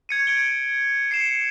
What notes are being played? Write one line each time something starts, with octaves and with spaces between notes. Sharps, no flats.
G#6 C#7 D#7
G#6 D7 G7
C7 C#7 E7